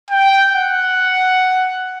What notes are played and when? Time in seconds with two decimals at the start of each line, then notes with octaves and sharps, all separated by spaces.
0.10 G5
0.53 F#5